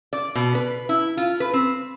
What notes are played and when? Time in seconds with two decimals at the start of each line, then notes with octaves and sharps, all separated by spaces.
0.13 D5
0.35 B2
0.55 B4
0.89 E4
1.17 F4
1.40 B4
1.53 C4